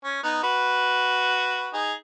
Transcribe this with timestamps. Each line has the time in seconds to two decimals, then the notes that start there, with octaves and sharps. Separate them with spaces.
0.04 C#4
0.23 B3 D#4
0.43 F#4 B4
1.73 D#4 G#4